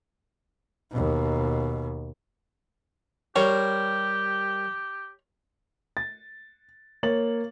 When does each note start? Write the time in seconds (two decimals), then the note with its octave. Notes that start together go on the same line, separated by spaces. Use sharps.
0.91 D#2 B2
3.36 G3 G4 A#4 C5 C#5
5.97 A6
7.03 A#3 C#5 A6 F#7